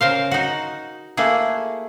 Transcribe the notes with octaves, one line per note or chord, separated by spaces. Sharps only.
C#3 A#4 C5 F5
D#4 F#4
A3 A#3 E4 G#4